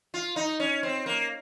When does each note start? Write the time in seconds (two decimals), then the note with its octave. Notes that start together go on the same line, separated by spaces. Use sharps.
0.14 F4
0.36 D#4
0.60 C#4
0.83 C4
1.06 A#3